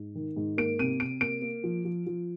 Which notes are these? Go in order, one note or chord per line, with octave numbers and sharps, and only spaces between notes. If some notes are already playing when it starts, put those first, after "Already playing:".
Already playing: G#2
D#3
G#2
A#3 D7
C3 D#7
C3 D7
A#3 D7
A#3
F3
F3
F3